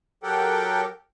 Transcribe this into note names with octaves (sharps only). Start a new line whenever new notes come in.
F#3 G4 A4 A#4 F#5 G5